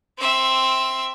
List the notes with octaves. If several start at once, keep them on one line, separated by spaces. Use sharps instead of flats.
C4 E5